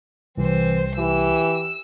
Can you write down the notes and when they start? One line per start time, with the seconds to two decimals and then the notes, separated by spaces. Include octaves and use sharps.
0.38 C2 E3 C4 C5
0.98 E3 G4 E6